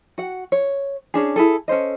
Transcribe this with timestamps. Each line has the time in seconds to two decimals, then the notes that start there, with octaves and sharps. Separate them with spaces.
0.18 F#4 F#5
0.52 C#5
1.14 C#4 D4 G#4
1.36 E4 G#4 A4
1.68 C#4 A4 C5 D#5